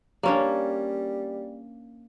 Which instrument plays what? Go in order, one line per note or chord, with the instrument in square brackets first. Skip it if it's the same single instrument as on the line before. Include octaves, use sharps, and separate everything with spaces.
[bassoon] G3 [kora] A#3 C#4 D4